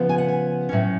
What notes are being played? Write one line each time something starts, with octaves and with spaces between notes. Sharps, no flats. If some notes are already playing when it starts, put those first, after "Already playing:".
Already playing: C#3 F3 B3
G#5
F#5
G#5
A2 F#3 C#4